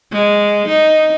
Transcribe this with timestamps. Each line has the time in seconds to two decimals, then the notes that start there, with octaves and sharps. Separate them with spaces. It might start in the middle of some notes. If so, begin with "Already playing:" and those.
0.13 G#3
0.68 D#4